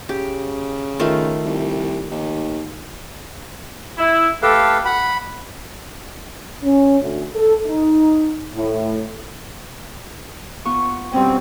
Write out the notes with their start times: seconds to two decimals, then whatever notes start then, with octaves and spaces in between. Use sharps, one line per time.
0.09 C#3 G4
0.99 D#3 A3 F4
1.45 C2
2.11 D#2
3.97 E4
4.42 A3 G4 A4 B4 F5
4.85 F#5 B5
6.63 C#4
7.00 D2
7.34 A4
7.65 D#4
8.54 A2
10.65 B3 F4 C#6
11.13 G2 B2 C4 C#4